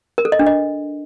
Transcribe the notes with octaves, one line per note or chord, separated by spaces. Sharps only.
A#4
A4
D#5
D4
D#5